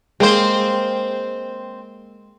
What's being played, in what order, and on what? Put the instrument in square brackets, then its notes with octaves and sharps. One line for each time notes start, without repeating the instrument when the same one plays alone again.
[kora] G#3 A#3 [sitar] C4 C5